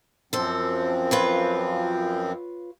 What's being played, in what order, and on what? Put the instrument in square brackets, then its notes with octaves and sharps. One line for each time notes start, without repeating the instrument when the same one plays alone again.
[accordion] F#2 F3 C4 [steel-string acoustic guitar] A4 C5
[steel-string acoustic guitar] F4 B4 C#5